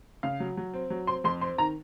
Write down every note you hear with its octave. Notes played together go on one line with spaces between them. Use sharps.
C#3 F5
F#3
F#3
C4
F#3
C4 C6
F2 C6
C4 C6
D#3 A#5